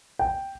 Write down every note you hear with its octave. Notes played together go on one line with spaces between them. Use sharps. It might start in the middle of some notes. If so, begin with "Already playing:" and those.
G5